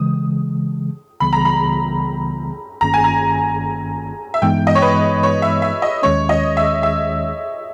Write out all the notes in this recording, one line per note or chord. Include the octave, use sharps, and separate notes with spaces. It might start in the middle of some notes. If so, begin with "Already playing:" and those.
Already playing: C#3 E3 G#3 D#6
C#2 C#3 E3 G3 B3 B5
A#5
B5
G1 G2 D#3 A#3 C#4 A#5
G#5
A#5
E5
G2 E3 G#3 B3 D#4 G5
D#5
C#5
B4
C#5
E5
E5
D#5
D#2 D#3 G#3 C#4 C#5
D#5
E5
E5